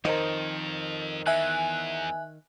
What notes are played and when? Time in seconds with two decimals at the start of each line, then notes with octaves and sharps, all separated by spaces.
0.05 F2 D#3 A#4 C5 D#5
1.26 E2 E5 G#5 F#6